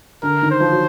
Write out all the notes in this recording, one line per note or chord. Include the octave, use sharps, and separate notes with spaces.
D3 A#4
D#3
C5
F3
F#3